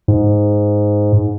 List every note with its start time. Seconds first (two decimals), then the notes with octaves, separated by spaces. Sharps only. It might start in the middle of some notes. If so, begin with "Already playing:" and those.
0.08 G#2